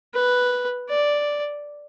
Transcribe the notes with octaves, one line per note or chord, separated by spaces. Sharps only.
B4
D5